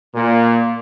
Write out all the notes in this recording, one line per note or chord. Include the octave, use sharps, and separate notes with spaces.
A#2